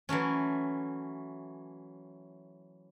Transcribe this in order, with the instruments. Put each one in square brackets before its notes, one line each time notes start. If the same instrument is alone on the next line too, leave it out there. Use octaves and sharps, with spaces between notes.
[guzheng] E3 F#3 A3 C#4